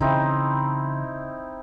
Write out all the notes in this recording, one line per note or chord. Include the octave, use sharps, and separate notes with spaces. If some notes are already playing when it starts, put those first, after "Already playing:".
C#3 E3 C4 D#4 E4